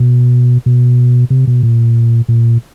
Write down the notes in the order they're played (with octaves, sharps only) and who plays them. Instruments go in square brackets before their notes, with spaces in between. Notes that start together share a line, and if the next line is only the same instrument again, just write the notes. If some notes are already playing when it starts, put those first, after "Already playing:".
Already playing: [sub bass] B2
B2
C3
B2
A#2
A#2